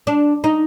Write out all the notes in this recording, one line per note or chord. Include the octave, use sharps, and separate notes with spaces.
D4
D#4